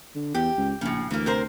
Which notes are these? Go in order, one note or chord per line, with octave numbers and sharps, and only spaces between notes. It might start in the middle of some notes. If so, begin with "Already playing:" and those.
D3
E2 G4
C#2
A#1 A2 C#3
D2 E3 A#3
C3 A#4 C5